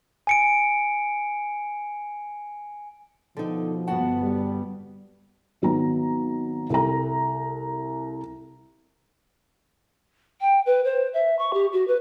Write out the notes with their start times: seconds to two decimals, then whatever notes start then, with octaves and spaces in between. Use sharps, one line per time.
0.27 G#5 C#7 D7
3.37 B2 D3 F3 D#4
3.87 G1 B3 F#4 F#5 A5
4.23 G3
5.62 G#1 F#3 B3 A#5
6.70 C2 A4 A#5
10.41 G5
10.66 B4
10.84 C5
11.14 E5
11.39 C#6
11.54 G4
11.73 F#4
11.87 B4